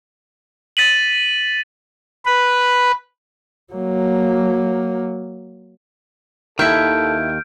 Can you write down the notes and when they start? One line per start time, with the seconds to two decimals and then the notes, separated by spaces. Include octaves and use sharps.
0.77 A6 B6 D#7 F#7
2.26 B4
3.73 F#3 A#3
6.59 D#2 D#3 E4 A4 E5 F6 G6 D7